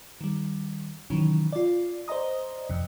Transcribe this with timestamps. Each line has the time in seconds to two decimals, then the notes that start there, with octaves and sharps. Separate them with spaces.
0.21 D#3 G3
1.10 C3 D#3 E3 F#3 C#4
1.53 F4 D5
2.08 C5 D5 D#5 A#5 D#6
2.69 F2 C3